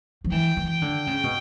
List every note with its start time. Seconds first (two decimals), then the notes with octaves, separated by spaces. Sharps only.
0.24 F3
0.32 E3 G5
0.57 E3
0.70 G5
0.82 D3
1.07 C#3
1.24 B2